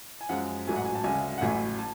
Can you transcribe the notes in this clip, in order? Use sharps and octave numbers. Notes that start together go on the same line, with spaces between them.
G#5
F#2 F3 G#3 F#5
A1 G#2 F#3 A3 G#5
F#5
G#5
A5
D2 C#3 G#3 G#5
F#5
A1 A2 F#3 A3 G#5
A5